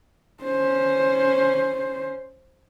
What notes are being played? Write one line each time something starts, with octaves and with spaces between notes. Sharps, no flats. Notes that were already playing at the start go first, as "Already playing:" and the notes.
C#4 C5